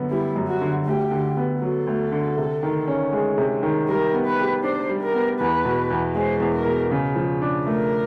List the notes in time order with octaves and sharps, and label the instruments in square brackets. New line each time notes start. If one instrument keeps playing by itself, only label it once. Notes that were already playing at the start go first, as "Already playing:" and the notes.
Already playing: [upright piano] F#2 D3 B3
[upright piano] G3 [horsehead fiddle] E4
[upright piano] F#2
[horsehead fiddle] F#4
[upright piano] D3
[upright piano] D2 [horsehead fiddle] G4
[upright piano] D3
B3
[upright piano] F#3 [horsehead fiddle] A4
[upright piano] D2
D3
C3
D#3
C#4
G#3
C3
D#3
[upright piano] G3 [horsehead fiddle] A#4
[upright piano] B3
[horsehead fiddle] B4
[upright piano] G4
[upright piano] D4 [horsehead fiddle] C5
[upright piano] G3
[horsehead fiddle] A#4
[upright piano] B3
[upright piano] E2 [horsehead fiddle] B4
[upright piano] B2
E2
[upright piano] G#3 [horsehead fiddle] C5
[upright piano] E2
[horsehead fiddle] A#4
[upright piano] B2
C#3
F3
D4
[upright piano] A3 [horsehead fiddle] A#4